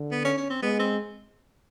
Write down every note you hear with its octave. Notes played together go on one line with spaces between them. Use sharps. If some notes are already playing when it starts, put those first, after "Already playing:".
Already playing: D3
B3
C#4
C#4
C4
G#3 B3
C4